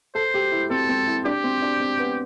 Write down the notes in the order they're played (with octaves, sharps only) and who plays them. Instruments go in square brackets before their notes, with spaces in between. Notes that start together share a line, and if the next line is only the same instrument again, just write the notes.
[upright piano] A4 [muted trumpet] C5
[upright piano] G4
E4
[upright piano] C4 [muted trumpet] A4
[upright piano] C4
E4
[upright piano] D4 [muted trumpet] G4
[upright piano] C4
D4
C4
B3